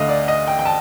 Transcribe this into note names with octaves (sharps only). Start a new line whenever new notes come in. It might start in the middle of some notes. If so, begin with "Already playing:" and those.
Already playing: D2 D3 D#5 F5
D5
D#5
G5
G5
A5